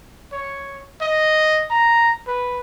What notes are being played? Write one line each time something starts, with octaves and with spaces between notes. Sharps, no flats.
C#5
D#5
A#5
B4